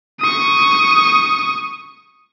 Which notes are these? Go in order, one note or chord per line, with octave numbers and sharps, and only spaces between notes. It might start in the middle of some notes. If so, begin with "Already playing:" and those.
C#6 D#6